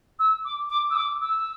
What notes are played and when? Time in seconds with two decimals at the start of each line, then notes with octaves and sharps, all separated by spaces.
0.19 E6
0.45 D6
0.70 D6
0.90 E6
0.96 D6
1.21 E6